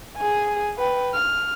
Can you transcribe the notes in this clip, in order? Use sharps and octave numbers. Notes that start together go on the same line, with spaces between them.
G#4 G#5
B4 G5
F6